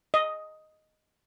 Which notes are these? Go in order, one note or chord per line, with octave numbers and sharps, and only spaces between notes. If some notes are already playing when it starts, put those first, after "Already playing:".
D#5